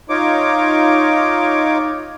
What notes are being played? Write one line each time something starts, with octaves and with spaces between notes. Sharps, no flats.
D#4 F4 C#5 D6